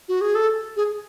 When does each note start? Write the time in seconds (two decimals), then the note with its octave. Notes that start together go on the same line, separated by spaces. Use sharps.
0.08 F#4
0.21 G#4
0.35 A4
0.77 G#4